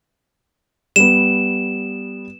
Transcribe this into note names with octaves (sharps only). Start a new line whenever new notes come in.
G3 B3 E7